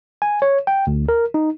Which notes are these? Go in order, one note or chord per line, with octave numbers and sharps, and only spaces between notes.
G#5
C#5
G5
D2
A#4
D#4